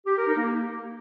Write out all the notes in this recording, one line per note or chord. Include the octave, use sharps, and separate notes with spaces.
G4
A#4
D#4
A#3